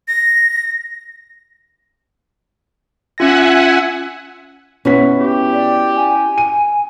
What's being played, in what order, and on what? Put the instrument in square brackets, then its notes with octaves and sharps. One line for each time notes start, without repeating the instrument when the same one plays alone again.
[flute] A#6
[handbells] C#4 F4 A#6 [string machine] E5 F#5 G#5
[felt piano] B2 B4 B6 [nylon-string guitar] C#4 E4 F#4
[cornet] G4
[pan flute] D5
G#5
[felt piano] D#7